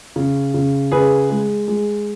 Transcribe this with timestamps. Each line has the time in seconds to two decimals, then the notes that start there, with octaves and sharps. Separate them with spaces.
0.16 C#3
0.54 C#3
0.92 C#3 G#4 B4
1.30 G#3
1.68 G#3